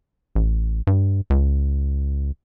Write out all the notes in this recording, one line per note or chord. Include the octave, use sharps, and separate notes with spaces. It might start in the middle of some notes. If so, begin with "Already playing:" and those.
A1
G2
C#2